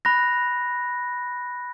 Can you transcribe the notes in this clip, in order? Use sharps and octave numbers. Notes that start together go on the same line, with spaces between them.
B5 F#6 A#6